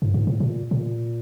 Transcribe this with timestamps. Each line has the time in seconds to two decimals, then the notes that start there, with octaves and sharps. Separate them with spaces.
0.02 G2
0.14 G#2
0.27 A2
0.40 A#2
0.71 A#2